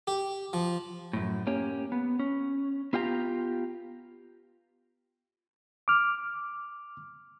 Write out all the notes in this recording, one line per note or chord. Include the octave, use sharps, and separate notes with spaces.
G4
F3
F#2 A2
A#3 C#4 G4 C#5
B3
C#4
B3 F4 G4 F#5 A#5
D6 F6